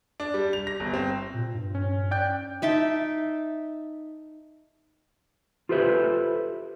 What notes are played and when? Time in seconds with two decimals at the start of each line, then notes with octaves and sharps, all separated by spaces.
0.20 D4
0.34 G3
0.53 F7
0.67 A#6
0.80 G1
0.93 C4
1.34 A#2
1.54 G2
1.75 C#4
2.11 D5 G5 F#6 G6
2.62 D#4 E5 G5 A5
5.69 F4 G4 A4 B4 C5 E5